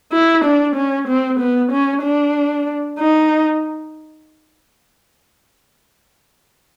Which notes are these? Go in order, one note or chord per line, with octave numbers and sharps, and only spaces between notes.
E4
D4
C#4
C4
B3
C#4
D4
D#4